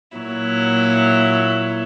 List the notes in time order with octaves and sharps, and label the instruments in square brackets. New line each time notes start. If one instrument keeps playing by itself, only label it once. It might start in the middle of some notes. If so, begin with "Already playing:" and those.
[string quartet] A#2 F#3 E4